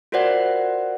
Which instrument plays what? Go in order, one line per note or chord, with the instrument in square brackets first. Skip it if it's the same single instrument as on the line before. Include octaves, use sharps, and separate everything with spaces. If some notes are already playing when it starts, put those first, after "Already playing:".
[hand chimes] F4 F#4 A#4 C5 D5 F#5